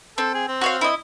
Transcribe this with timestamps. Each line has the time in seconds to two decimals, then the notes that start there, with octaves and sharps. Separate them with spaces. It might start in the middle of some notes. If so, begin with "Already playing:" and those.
0.18 C4 A4
0.34 G#4
0.48 C4
0.61 F#4 C#5 F5
0.81 E4 D#5